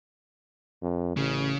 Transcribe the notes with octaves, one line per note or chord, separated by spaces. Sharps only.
F2
A1 C#3